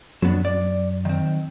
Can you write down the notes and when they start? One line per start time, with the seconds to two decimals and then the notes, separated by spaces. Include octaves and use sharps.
0.22 F#2 F#3 B3 D4
0.45 D5
1.05 D#3 C4